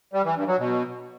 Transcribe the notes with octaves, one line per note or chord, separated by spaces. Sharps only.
G3
E3
G2
F#3
B2